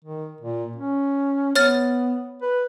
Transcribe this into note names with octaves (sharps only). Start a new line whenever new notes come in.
D#3
A#2
C#4
B3 C#5 F6 A6
B4